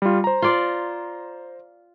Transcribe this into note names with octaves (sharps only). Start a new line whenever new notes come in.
G3 F4
C5 A#5
F4 D5